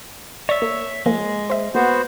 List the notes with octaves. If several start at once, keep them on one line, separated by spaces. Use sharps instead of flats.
C#5 D5 E5 A6
A#3
F3 G#3 A#3
C5 E5
A#3 B3 F#4 C5